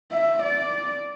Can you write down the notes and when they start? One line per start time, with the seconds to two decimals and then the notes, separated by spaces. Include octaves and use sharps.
0.12 E5
0.42 D5